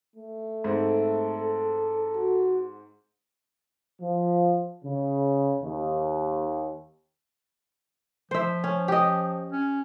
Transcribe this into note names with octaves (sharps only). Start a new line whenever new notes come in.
A3
G#2 C4 A4
F#4
F3
C#3
D#2
F3 C5 E5
C#4
G4 D#5
C#4